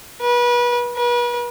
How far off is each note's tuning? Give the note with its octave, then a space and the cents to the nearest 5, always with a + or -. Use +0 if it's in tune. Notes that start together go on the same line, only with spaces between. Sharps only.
B4 -30
B4 -40